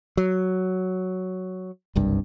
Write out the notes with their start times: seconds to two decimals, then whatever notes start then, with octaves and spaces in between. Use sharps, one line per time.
0.17 F#3
1.96 F#1 C2 G2